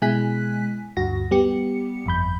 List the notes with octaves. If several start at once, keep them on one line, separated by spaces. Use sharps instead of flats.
B2 G#3 E4 G#5 F#6 B6
D2 G2 F#4 A#6
G3 B3 G4 C#7
G1 F2 B5 G6